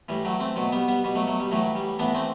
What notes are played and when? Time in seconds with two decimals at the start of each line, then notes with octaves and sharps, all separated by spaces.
0.09 A2 E3 G3
0.25 F#3 A3
0.40 A3 C4
0.56 B2 F#3 A3
0.72 G3 B3
0.88 G3 B3
1.04 B2 G3
1.15 F#3 A3
1.27 F#3 A3
1.40 G3
1.51 A2 E3 F#3 A3
1.75 G3
1.99 A2 E3 B3 D4
2.15 A3 C4